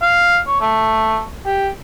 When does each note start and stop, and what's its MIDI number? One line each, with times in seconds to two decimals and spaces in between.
0.02 0.39 77
0.47 0.60 73
0.61 1.23 57
1.46 1.69 67